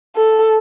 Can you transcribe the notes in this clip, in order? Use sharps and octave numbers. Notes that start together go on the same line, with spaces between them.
A4